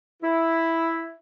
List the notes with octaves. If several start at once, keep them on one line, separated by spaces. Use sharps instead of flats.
E4